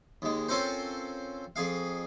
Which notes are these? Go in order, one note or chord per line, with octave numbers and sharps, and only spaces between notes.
D#2 G#3
C4 C#4 F4 A4 A#4 C5
F2 G#4 F5